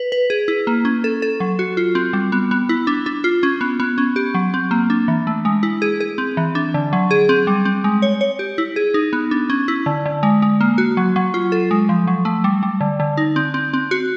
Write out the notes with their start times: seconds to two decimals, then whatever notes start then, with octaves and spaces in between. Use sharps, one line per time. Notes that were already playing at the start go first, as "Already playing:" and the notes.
Already playing: B4
0.12 B4
0.30 G#4
0.48 E4
0.67 A#3
0.85 C#4
1.04 A4
1.22 A4
1.40 F#3
1.59 F#4
1.77 F4
1.95 C4
2.13 G3
2.32 B3
2.51 B3
2.69 E4
2.87 D4
3.06 D4
3.24 F4
3.43 C#4
3.61 B3
3.80 B3
3.98 C#4
4.16 G4
4.34 F#3
4.54 C4
4.71 A#3
4.90 D4
5.08 E3
5.27 A3
5.45 G#3
5.63 E4
5.82 G#4
6.00 G#4
6.18 C4
6.37 E3
6.55 D4
6.74 D3
6.93 F#3
7.11 G#4
7.29 C4
7.47 G3
7.65 C4
7.84 G#3
8.02 C#5
8.21 C#5
8.39 G4
8.58 E4
8.76 G#4
8.94 D#4
9.13 B3
9.31 D4
9.50 C#4
9.68 E4
9.86 D3
10.06 D3
10.23 G#3
10.42 G#3
10.61 A#3
10.78 F#4
10.97 F#3
11.16 F#3
11.34 F4
11.52 A4
11.71 G#3
11.89 F3
12.07 F#3
12.25 A3
12.44 G3
12.63 G3
12.81 D3
13.00 D3
13.17 D#4
13.36 C4
13.54 C4
13.73 C4
13.91 F#4